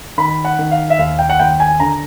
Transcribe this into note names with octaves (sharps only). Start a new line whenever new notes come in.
D#3 B5
F#5
D#3
F5
E5
D#2 F5
G5
F#5
D#2 G5
G#5
D3 A#5